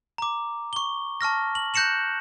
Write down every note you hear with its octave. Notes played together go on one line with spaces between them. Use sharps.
A#5 D6
C#6 G7
A5 C#6 F6 A#6
F#7
F#6 G6 A#6 C#7 E7 F#7